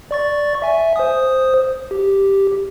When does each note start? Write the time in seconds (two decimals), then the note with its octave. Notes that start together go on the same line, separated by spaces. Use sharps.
0.11 D5 C#6 A6
0.62 E5 G#5
0.96 C5 D#6
1.91 G4